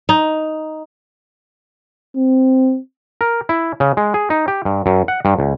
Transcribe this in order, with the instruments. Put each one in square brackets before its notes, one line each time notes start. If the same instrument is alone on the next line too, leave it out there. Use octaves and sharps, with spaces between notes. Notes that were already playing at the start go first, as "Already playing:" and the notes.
[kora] D#4
[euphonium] C4
[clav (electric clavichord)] A#4
E4
C#3
G#3
G#4
D#4
G4
G2
F#2
F#5
G2
C#2